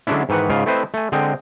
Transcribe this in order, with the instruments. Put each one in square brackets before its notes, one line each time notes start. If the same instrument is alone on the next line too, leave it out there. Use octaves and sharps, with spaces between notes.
[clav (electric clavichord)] D3 F#3 G#3 C#4 D4 E4
G#2 D#3 E3 B4 F#5
G#2 C#3 F4
A3 C4 E4 B4 C5 D#5
A3 G#5
D3 G#3 C4 D#5 G5